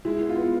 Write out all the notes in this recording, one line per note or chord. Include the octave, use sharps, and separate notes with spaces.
G#3 E4
B3
F4
B3